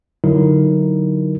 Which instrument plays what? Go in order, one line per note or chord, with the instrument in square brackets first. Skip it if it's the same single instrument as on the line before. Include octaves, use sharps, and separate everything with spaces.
[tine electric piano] D3 F#3 D#4 E4 A#4